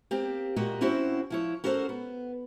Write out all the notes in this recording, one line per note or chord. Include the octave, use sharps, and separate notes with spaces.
A#3 C4 G4
A#2 A#3 F#4 G4 D#5
C4 C#4 E4 F#4 C5
F3 E4 C#5
C#4 F#4 A4 A#4 C5
B3